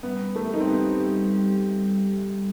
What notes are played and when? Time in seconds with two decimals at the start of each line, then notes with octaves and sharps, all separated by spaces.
0.03 G3 B3
0.36 A3 G4
0.54 D#4
0.61 C4
0.68 B3 G4
1.01 G3
1.33 G3